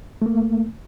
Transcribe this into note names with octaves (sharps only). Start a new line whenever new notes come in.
A3 A#3